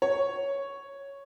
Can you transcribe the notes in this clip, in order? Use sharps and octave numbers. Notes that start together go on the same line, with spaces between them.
C#5